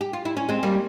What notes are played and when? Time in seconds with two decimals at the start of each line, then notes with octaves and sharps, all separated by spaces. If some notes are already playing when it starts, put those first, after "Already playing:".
0.01 G4
0.13 F4
0.25 E4
0.37 C#4
0.49 G#3 C4
0.63 G3 A#3